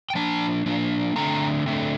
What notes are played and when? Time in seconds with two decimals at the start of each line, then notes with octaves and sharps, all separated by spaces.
0.10 G5
0.15 F3 A#3 D4 A5
0.66 F3 A#3 D4
1.16 D3 A3 C4 A#5
1.66 D3 A3 C4